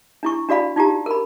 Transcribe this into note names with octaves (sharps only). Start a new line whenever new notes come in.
D4 E4 C#6
D4 F#4 D5 F5 B5
D#4 F4 G4 A#5
A#4 B5